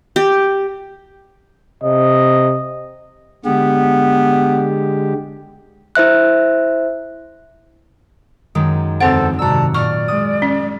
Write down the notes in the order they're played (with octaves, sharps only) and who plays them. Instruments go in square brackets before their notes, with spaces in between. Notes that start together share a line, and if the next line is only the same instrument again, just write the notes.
[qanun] G4
[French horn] C3 [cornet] D#5
[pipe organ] D3 G#3 G4 [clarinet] B3
[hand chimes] E4 C5 E5 F#6
[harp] F#2 D#3 G#3
[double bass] E2 D3 [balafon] C4 F#5 [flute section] A4 C5 [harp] A6
[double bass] G#2 C3 [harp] F#4 E6 [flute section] D5 A5 A#5
[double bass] A#2 [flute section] D5 [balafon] C#6 [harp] F6
[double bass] G#3 [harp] D#6
[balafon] C#4